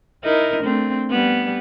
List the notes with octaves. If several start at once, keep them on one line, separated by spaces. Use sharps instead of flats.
D#4 E4 A#4
A3 C4 D4
G3 B3